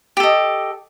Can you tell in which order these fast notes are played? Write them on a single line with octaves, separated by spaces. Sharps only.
G4 A4 D#5